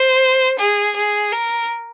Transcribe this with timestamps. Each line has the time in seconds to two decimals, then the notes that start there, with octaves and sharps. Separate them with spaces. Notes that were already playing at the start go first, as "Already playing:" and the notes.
Already playing: C5
0.59 G#4
0.96 G#4
1.32 A#4